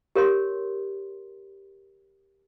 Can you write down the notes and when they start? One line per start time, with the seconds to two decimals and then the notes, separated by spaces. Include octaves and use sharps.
0.16 G4 A#4 C#5 C6